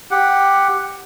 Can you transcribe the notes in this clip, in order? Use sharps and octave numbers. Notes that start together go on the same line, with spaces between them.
G4 F#5